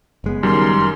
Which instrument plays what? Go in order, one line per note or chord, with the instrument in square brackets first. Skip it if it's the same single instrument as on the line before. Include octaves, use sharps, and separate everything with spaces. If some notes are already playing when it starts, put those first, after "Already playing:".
[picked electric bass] F#1 G#3 B3
[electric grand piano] F#2 D#3 [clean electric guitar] G3 [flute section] A#4 C6